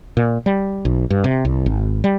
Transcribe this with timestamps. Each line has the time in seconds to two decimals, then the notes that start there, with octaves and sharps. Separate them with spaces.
0.17 A#2
0.46 G3
0.85 B1
1.10 G2
1.24 C3
1.45 C2
1.66 G#1
2.04 G3